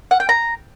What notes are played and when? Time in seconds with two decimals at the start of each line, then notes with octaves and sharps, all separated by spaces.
0.11 F#5
0.20 G5
0.29 A#5